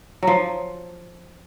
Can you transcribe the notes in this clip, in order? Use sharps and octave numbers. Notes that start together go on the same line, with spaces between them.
F3 F#3